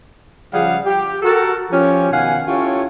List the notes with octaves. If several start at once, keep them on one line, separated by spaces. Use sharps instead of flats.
C#3 F3 G3 G#4 F5 F#5
G4
F#4 A4 A#4
F3 C#4 G4
B2 D#3 F5 F#5 G#5
C#4 E4 F4 G4 A4 C#5